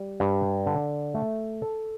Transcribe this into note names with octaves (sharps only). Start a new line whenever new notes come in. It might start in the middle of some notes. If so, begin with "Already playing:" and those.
Already playing: G3
G2
D3
A3
A4